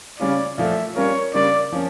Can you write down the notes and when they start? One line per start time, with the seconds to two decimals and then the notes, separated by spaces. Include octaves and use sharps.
0.20 C#3 G3 C#4 F4 D5
0.58 A#2 F3 A3 E5
0.96 G3 A#3 C#4 F4 A#4 C#5
1.34 C#3 G3 A#3 D4 D5
1.72 F3 A#3 C#4